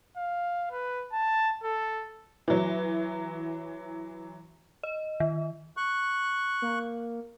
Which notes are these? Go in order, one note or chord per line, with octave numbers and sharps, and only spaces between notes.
F5
B4
A5
A4
E3 F#3
D#5
D#3
C#6 F#6
A#3